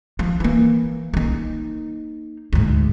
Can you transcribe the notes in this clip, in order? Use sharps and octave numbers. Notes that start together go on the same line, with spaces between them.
F3
E3 A#3
A#3 D#4
D2 G#2